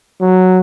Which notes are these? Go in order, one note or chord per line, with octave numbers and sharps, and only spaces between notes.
F#3